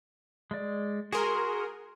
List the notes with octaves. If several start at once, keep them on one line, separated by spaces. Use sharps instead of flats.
G#3 D5
F#4 G#4 A#4 C6